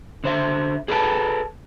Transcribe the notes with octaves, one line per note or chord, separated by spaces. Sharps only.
D3 C5 E5
G#4 A4 B4 D#5 G5 A5